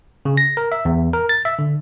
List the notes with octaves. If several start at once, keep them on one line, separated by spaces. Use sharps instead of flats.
C#3
A#6
A#4
E5
E2
A#4
A6
E5
D3